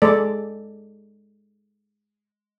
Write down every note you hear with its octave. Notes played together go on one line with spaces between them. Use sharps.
G#3 A4 D5